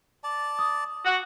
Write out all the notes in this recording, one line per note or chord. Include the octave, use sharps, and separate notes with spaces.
D5 A5
D#6
F#4